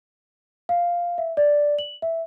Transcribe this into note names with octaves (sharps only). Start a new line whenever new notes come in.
F5
E5
D5
F#7
E5